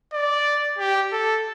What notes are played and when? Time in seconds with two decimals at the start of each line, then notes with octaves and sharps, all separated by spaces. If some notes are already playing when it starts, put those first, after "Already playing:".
0.13 D5
0.78 G4
1.12 A4